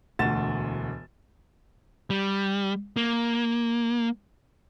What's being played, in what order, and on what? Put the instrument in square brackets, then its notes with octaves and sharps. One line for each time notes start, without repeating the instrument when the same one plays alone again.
[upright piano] E1 D2 F#5 A6 E7
[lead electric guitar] G3
A#3